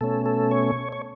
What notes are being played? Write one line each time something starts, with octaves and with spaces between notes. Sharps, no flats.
B2 A3 C#4 A4
A4
C#5
C#5